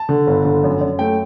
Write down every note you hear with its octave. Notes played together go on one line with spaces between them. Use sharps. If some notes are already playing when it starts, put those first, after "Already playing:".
Already playing: A5
D3
G1
D3
F#2
F#2
A3 G5